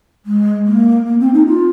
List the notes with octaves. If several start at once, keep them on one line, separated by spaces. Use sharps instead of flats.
G#3
A#3
A#3
C4
D#4
F4